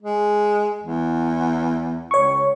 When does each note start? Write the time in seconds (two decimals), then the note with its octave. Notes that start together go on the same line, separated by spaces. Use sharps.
0.02 G#3
0.84 E2
2.11 C#2 C#5 C#6